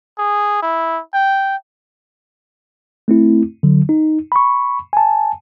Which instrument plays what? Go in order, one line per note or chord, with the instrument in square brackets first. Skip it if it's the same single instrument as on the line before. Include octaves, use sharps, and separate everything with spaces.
[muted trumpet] G#4
E4
G5
[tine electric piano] A3 C4 E4
D3 F#3
D#4
B5 C#6
G#5 A5